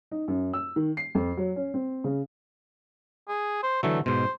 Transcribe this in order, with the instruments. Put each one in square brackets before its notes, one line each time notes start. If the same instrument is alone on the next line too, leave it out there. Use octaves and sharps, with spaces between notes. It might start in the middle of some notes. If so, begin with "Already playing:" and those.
[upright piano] D#4
F#2
E6
D#3
C7
F2
F#3
C#4
C4
C#3
[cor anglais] G#4
C5
[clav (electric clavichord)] D3 E3 F#3 [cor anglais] A3
[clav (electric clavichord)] G#2 B2 [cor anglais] C5